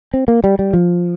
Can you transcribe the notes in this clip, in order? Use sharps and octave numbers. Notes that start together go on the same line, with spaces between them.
C4
A#3
G3
G3
F3